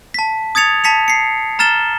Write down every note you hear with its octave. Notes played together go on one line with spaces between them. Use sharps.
A5 B6
D#6 G#6 A6 C#7 F7
A5 B6 C#7 F7
C7 C#7
A#5 F6 A6 E7 G7